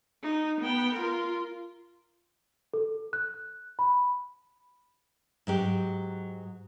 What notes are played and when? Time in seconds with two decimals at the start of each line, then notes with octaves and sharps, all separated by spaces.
0.23 D#4
0.61 B3 G5
0.95 F4 A#4
2.74 A4
3.13 F#6
3.79 B5
5.47 G#2 F#3 G4